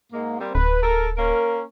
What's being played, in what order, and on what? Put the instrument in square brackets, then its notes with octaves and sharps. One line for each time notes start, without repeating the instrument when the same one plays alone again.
[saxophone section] G#2 G#3 A#3
G3 A#3 C4
[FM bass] D1 [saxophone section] B4
[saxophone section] A4 A#4
A#3 C#4 A#4